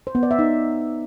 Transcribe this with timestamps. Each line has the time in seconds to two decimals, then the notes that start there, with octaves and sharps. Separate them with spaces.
0.07 C5
0.15 B3
0.23 D5
0.31 E5
0.39 D#4